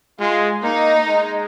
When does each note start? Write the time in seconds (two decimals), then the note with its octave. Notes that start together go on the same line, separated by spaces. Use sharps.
0.20 G#3 F4
0.63 A#3 D#4
1.06 G#3